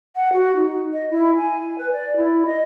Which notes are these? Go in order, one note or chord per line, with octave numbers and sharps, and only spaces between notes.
F#5
F#4
D#4
D#5
E4
G#5
B4
D5
E4
D#5